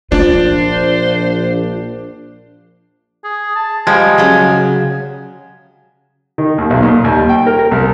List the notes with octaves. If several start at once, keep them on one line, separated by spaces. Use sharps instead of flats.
A#1 D4 F4 C5 D5
G#4
A5
F3 G3 G#3 G#5
C#3 F#3
D#3
D#2
B1
A#2
D#2
G3
G5
A#4
A#4
C2